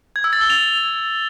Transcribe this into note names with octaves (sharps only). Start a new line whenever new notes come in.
G#6
E6
A6
G7
F7